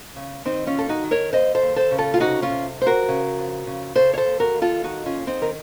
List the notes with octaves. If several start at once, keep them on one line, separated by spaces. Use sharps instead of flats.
C#3
D#3 C4 D#4
C#4 F4
D#2 A4
D#4 F#4
D#3
A#4 C#5
D#2 C5 D#5
A4 C5
D#2
A4 C5
C#3
F4 A4
F4
C3 D#4 F#4
C#4 F4
C3
F2 C5
F#4 A#4
C#3
F2
C#3
C#3 A4 C5
C#5
A4 C5
D#2
F#4 A#4
D#2
F4 A4
D#3 D#4 F#4
C#4 F4
D#2
C4 D#4
D#3 A#4